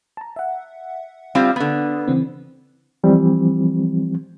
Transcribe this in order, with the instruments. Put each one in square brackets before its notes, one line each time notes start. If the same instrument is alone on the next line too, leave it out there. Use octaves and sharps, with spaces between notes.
[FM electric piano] A5 A#5
E5 F#5
[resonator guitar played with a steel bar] G3 C4 F4
D3 B3
[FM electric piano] C#3 E3 C4
[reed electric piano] E3 F3 G3 C4